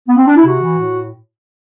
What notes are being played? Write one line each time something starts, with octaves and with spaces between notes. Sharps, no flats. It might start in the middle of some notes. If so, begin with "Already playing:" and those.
B3
C4
D4
E4
C3 F#4
E3
A2